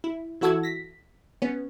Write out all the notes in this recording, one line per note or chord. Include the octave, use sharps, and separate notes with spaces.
E4
E3 E4 F#4 A4 E6 G#6
A#6 B6
B3 C#4